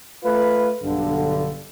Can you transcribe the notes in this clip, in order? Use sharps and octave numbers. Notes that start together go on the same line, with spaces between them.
A3 F4 B4
B1 G2 D3